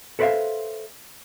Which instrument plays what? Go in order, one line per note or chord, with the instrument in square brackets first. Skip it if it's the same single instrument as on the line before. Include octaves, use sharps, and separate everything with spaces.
[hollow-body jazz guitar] A4 B4 C5 D5 E5 F5